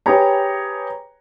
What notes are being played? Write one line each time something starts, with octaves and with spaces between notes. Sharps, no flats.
G4 G#4 B4 C#5 A#5